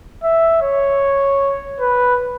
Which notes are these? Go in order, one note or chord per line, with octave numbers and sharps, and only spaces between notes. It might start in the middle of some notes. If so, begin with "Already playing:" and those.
E5
C#5
B4